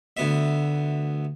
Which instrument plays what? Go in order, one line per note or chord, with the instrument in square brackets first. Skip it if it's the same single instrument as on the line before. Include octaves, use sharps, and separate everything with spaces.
[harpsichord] D2 B3 E5